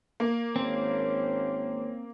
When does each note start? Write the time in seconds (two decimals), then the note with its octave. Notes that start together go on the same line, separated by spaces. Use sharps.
0.20 A#3
0.56 G#1 C4 C#4 C5